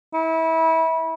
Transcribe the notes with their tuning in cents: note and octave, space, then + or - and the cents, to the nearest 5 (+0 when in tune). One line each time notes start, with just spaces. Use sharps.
E4 -25